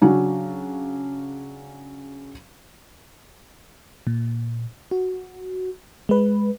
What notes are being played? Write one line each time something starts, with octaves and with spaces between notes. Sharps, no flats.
C#3 F#3 C#4 D4
A#2
F#4
G#3 B4